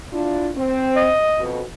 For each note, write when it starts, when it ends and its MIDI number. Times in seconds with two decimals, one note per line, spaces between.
0.13 0.50 62
0.13 0.50 64
0.13 0.50 65
0.56 1.11 60
0.96 1.47 75
1.40 1.62 41
1.40 1.62 47